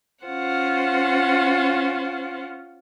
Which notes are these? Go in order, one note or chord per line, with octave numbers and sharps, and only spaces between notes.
C#4 F4 C5 F#5